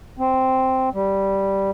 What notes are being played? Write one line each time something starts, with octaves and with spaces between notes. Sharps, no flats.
C4
G3